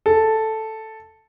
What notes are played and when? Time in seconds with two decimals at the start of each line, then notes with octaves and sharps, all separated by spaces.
0.06 A4